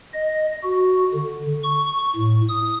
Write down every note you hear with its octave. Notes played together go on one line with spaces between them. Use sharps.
D#5
F#4
D3
C#6
A2
D#6